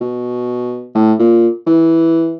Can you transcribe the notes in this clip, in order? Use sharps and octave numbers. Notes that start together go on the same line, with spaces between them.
B2
A2
A#2
E3